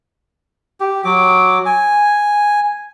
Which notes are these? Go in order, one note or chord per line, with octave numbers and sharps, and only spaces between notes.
G4
F#3 D6
G#5